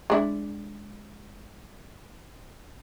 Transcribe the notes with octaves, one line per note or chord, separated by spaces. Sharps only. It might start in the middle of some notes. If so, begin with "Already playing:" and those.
G#3 D4 E4